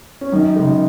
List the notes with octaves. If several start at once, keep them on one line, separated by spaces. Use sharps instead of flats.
C#4
F#2 D#3 D#4
C#3 G#3